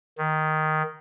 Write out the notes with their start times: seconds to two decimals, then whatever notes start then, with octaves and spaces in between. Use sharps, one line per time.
0.18 D#3